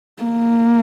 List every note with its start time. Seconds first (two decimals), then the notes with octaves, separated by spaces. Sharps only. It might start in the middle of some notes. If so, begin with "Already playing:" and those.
0.23 A#3